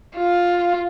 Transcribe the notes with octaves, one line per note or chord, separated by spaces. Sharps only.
F4